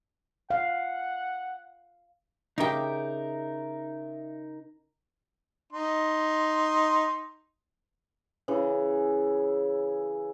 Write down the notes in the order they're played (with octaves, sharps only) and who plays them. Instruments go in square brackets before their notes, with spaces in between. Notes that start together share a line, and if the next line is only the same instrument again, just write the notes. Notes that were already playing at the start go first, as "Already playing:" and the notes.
[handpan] F5 [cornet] F#5
[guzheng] C#3 G4 [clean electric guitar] D#4 A#4 [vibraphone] E5
[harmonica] D#4 C6
[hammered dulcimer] C#3 E3